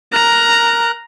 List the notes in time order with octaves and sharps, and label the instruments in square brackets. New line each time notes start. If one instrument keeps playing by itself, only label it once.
[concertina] A#4 F#6 [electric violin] A#5